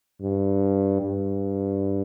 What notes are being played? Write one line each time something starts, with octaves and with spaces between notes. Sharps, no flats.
G2
G2